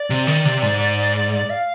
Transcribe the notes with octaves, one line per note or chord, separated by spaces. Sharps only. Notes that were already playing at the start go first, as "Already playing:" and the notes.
Already playing: D5
C3
D#3
C3
G#2
F5